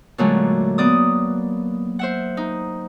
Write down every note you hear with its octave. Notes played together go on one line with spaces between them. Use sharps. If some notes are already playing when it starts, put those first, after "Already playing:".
A#2 D3 F#3 G#3 A3
A#3 B3 D5 D#6
C5 E5 F#5
D#4